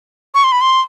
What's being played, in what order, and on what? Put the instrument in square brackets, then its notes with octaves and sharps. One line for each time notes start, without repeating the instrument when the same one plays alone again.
[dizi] C#6
C6
B5
C6